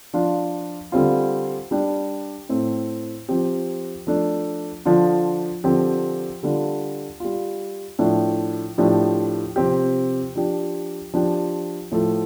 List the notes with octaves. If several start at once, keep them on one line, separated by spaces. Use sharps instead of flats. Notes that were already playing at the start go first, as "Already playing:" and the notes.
F3 D4 F4
D3 G3 C4 F4
G3 D4 G4
A2 A3 C4
F3 C4 G4
F3 A3 D4
D3 F3 D4 F4
D3 F3 C4 G4
D3 G3 D4 F4
G3 F4
A2 F3 D4
A2 F3 D4 G4
C3 F3 C4 G4
F3 D4 G4
F3 D4 G4
A2 F3 A3